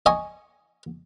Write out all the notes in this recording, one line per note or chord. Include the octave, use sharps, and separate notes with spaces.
D#5 G#5 C#6